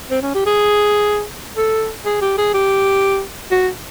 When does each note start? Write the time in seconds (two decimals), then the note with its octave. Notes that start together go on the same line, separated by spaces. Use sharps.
0.11 C4
0.22 C#4
0.35 G4
0.46 G#4
1.56 A4
2.05 G#4
2.21 G4
2.38 G#4
2.54 G4
3.51 F#4